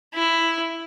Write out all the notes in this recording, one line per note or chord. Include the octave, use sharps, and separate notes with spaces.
E4